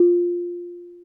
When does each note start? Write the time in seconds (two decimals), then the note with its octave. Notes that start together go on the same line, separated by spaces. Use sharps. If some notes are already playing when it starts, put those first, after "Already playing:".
Already playing: F4